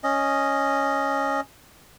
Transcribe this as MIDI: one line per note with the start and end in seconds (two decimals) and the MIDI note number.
0.04 1.41 61
0.04 1.41 75